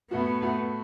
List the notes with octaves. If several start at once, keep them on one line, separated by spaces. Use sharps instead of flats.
A2 A3 B3 F#4
A2 A3 F#4